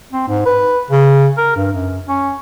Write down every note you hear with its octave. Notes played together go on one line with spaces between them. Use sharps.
C4
G#2
B4
C#3
A#4
G2
F#2
C#4